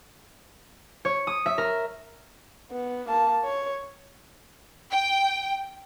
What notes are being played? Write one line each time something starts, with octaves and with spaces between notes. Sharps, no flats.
C#5
D#6
E5
A#4
B3
A#3 A5
C#5
G5